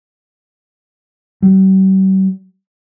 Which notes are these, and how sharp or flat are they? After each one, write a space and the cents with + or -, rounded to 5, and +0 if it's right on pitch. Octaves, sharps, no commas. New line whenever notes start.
G3 -45